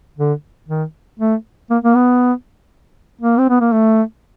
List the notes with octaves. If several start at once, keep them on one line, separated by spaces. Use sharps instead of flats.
D3
D#3
A3
A#3
A#3
B3
A#3
C4
B3
A#3
A3